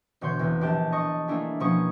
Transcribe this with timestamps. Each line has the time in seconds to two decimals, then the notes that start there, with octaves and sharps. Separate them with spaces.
0.21 E1 B2 D3 C#5 C6 G6
0.39 E2 C3
0.61 A#1 D4 G4 A5
0.92 D#5 C#6 D#6 A6
1.28 G3 A3 A#3 D4 E4 G#4
1.60 B2 F3 A#3 C#4 C#6 D#6